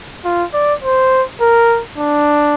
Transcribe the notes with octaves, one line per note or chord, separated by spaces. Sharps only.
F4
D5
C5
A#4
D4